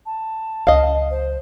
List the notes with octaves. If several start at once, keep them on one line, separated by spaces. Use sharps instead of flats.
A5
C#2 F#3 D#5 F5
C5